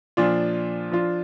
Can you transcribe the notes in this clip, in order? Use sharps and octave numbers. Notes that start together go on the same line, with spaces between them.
A#2 F3 D4 F4
F3 D4 F4